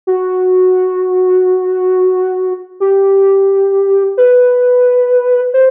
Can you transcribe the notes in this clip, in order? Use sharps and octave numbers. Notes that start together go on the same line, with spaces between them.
F#4
G4
B4
C5